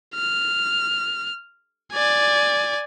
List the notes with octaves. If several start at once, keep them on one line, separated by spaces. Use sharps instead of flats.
F6
D5 G#5